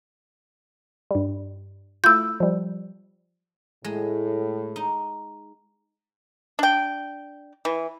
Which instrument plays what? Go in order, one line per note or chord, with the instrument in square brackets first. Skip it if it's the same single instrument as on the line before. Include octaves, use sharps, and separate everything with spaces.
[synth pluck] G2 G3
[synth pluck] A3 E4 F4 [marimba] E6 G6
[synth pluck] F3 G3
[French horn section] A2 [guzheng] G#3
[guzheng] D#4
[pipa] D4 G5
E3